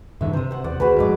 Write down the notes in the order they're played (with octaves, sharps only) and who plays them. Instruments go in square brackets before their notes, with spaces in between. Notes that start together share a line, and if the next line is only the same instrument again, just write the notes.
[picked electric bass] G2 D3 D#3 [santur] E5
[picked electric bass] C3 [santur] C5 D#6
[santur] C5 F#5
[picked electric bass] E2 [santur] D5 F#5
[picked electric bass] D2 [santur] F#4 G#4 B4
[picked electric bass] F2 G#2 [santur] D#5 D6